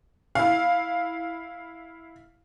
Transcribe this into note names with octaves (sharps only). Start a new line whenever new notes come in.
E4 F5